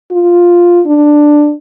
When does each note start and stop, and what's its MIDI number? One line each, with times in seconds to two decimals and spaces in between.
0.12 0.81 65
0.87 1.52 62